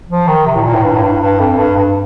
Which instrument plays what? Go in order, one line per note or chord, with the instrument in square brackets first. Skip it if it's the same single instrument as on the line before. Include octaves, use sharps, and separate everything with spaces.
[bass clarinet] F3
D#3
C3
A2
A#2
A2
G2
A2
G2
G2
F2
G2
G2